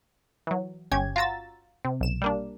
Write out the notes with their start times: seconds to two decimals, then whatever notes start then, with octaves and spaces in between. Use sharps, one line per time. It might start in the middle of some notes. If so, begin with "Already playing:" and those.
0.47 E3 F#3
0.92 G1 C#4 G4 G#6
1.16 F4 F#4 A#5 E6 A6
1.85 C3
2.01 B1 E7
2.22 G3 A#3 D4